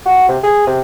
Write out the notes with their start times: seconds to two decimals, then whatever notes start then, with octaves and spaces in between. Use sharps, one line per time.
0.06 F#4
0.28 C3
0.43 G#4
0.66 C3